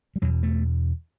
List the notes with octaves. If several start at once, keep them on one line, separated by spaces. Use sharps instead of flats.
G3
E2 B2 F#3
A3